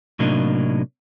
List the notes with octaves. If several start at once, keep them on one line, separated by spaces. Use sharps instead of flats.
A2 C3 F#3 A#3 D4 D#4